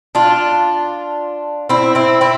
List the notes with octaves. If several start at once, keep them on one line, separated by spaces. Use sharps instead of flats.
D4 F4
C4 E4
C4 E4
C4 E4